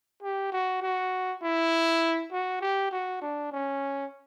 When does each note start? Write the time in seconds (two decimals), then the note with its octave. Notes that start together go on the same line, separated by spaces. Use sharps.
0.23 G4
0.52 F#4
0.82 F#4
1.42 E4
2.32 F#4
2.61 G4
2.92 F#4
3.21 D4
3.52 C#4